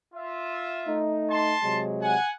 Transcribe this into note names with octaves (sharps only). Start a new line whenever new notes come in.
F4 E5
A3 D#4
A5 C6
C3 F#3 G#3
F#5 G#5